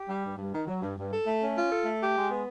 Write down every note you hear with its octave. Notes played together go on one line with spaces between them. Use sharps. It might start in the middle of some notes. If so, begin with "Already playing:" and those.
Already playing: G4
G3
G2
G2
D#3
F#3
G2
G2
A4
A3
C#4
F4
A4
A3
G4
G#3
B3